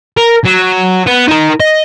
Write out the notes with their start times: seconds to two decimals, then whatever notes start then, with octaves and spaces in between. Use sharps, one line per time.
0.17 A#4
0.45 F#3
1.07 B3
1.29 D#4 A#4
1.60 D#5